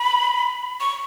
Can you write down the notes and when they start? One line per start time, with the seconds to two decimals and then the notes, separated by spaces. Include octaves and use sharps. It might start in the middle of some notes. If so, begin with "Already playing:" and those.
Already playing: B5
0.80 C#6